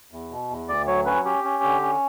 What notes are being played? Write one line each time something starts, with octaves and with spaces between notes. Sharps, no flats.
E2
B2
E2
D2 D5
F#3 C#5
C#4 B4
C#4 G4
C#4
D3
C#4